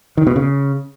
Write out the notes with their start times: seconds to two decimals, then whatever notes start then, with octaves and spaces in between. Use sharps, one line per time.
0.17 D#3
0.27 B2
0.36 C#3